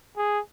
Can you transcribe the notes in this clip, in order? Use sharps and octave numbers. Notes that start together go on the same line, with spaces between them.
G#4